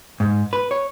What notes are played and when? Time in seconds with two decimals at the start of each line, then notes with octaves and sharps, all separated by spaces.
0.20 G#2
0.53 B4
0.71 C#5